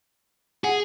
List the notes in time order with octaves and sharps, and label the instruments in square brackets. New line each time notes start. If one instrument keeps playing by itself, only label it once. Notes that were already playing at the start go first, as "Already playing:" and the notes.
[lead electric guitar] G#4 [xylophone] F#5 G#5